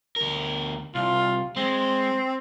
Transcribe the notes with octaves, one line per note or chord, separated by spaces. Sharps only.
D2 A#4
C2 F4
G#3 C4